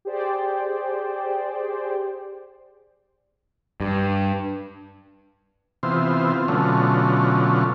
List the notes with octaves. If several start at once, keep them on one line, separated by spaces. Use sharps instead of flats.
G4 G#4 C5 D5 G5
G2
C3 E3 B3 F4 C5
C4 F4
B2 D3 F#3 A3 C#4 F4